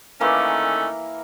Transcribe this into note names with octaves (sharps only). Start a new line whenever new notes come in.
D#3 E3 A3 A#3 C#4 A#4